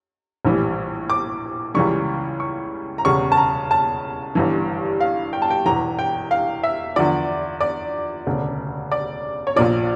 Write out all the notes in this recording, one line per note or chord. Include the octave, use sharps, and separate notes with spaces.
A#1 A2 E3 G3
D6
C#2 C#3 E3 G3 C#6
C#6
A#5
E1 E2 C#3 G3 C#6
A5
A#5
A5
G1 G2 E3
F5
G5
A5
G5
E1 E2 E3 A#5
G5
F5
E5
E2 D3 F3 D5
D5
E1 D2 C#3
D5
C#5
A#1 A#2 F3 D5